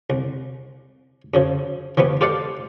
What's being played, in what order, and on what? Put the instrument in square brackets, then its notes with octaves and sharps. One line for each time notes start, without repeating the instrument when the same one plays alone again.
[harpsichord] C2
F#2 C#3 F3
E3 F3 G3 B3
F4 G4 A4 D5 F5 F#5